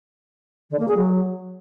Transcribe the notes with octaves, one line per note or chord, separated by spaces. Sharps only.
D3
A#3
G#4
F#3